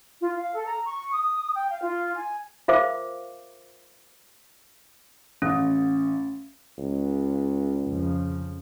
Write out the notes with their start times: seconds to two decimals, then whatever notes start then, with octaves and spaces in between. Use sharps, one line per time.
0.20 F4
0.36 F5
0.54 A4
0.66 A#5
0.85 C#6
1.13 D#6
1.54 G5
1.71 F5
1.82 F4
2.15 G#5
2.68 F4 A#4 C5 E5 F5 D6
5.42 A1 C#4
6.78 C#2
7.88 F2 C#3 F3